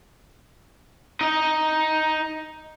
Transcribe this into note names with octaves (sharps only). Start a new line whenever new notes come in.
D#4 D#5